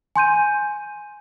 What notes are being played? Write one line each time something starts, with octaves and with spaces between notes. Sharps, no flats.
G#5 C6 G6 D#7